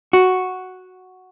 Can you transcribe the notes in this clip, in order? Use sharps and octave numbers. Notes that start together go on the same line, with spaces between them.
F#4